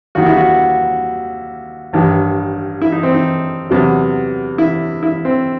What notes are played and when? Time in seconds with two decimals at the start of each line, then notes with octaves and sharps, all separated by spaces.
0.15 D#2 D#3 G3 F#4
0.26 E4
0.37 F#4
1.93 A1 G2 D#3
2.81 E4
2.92 D#4
3.03 C4
3.14 D#4
3.70 E2 C3 F#3
4.58 E4
5.03 E4
5.25 C4